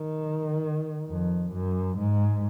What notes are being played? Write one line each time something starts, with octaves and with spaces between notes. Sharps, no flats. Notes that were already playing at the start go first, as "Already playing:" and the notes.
Already playing: D#3
F2
F#2
G#2